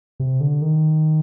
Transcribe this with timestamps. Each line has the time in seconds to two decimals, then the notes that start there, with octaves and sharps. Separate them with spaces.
0.20 C3
0.40 D3
0.62 D#3